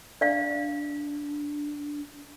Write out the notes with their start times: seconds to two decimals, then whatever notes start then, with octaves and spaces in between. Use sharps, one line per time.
0.21 D4 D5 F5